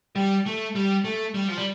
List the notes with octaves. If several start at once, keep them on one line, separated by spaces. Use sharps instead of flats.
G3
A3
G3
A3
G3
F3
G3